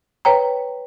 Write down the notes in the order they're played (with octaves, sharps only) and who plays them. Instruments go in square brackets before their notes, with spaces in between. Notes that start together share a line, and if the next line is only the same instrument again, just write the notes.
[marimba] B4 C#5 G5 A#5